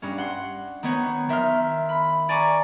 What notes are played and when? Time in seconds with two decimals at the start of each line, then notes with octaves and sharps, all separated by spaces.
0.02 G2 C#4
0.18 F#5 C6
0.83 D#3 B3 C#5
1.29 D#3 E5 C6 F6
1.89 B5
2.29 D5 G#5 A#5 C#6 D6